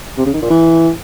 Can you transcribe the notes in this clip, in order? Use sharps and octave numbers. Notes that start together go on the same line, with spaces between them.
C3
C#3
D#3
A#2
E3